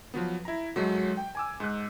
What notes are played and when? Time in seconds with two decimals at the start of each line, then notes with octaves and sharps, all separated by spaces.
0.14 F3 F#3 B3
0.45 E4 A#5
0.76 G#2 F#3 G#3 A3
1.17 G5
1.35 G#5 D6 E6
1.60 G#2 F#6